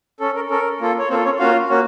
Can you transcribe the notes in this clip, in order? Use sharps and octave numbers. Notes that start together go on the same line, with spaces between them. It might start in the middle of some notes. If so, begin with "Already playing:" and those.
C#4 A4
A#4
C#4 A4 A#4
A#3 F4 A4
C#5
A#3 C4 F4 A4 C5
C#4 C#5
A#3 C#4 F4 F#4 F5
A#3 C#4 F#4